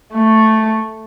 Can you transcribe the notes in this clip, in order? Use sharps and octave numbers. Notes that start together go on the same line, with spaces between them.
A3